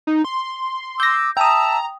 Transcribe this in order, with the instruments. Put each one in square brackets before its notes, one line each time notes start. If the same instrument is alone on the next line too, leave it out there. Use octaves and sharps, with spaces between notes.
[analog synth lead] D#4
C6
[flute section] D6 E6 [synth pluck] G6 A#6
[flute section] E5 A5 E6 [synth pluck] G5 D#6 [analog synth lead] A#5